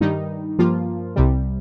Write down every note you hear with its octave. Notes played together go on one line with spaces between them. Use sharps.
G2 D#3 G3 D#4
G2 F3 A#3 F4
C2 C3 G3